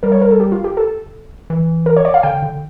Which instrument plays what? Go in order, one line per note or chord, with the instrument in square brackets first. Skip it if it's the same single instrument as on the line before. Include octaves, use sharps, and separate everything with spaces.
[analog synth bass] G3 [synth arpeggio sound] A#4
[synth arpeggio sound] C#5
A#4
A4
G4
F4
G4
A4
[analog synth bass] E3
[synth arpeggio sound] A#4
C#5
D5
F5
[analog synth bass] D3 [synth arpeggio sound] G5
[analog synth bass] D3